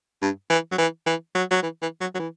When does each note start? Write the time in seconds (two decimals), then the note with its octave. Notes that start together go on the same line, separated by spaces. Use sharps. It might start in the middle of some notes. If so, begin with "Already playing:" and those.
0.22 G2
0.50 E3
0.72 F#3
0.78 E3
1.06 E3
1.35 F#3
1.51 F#3
1.63 E3
1.82 E3
2.01 F#3
2.15 F#3
2.19 E3